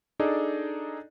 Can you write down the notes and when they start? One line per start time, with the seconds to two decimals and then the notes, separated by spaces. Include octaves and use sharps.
0.20 D4 D#4 G#4 A4 D5 D#5